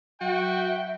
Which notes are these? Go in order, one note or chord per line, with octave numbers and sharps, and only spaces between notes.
F#3 F#4 E5 G5